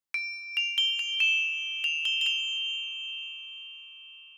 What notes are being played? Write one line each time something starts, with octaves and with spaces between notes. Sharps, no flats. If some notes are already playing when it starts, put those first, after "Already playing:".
D7
F7
G7
F7
E7
F7
G7
G7
F7